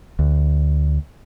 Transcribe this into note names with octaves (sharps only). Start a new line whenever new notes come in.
D2